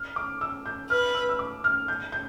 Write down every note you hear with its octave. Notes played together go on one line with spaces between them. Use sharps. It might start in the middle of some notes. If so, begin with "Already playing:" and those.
Already playing: F6
D6
E6
G6
B4 F6
E6
E6
D6
F6
G6
G6